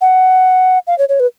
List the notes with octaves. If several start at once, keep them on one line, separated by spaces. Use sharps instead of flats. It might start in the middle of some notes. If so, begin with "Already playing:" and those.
F#5
F5
C#5
C#5
B4